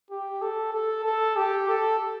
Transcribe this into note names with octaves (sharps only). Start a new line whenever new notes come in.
G4
A4
A4
A4
G4
A4